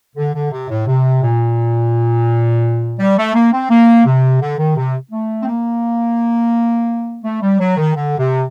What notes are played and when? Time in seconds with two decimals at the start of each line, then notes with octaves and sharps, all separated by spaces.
0.16 D3
0.34 D3
0.51 C3
0.69 A2
0.87 C3
1.22 A#2
2.99 G3
3.17 A3
3.35 A#3
3.53 C4
3.70 A#3
4.06 C3
4.41 D3
4.58 D#3
4.76 C3
5.12 A3
5.42 C4
5.47 A#3
7.24 A3
7.42 G3
7.60 F#3
7.77 D#3
7.95 D3
8.18 C3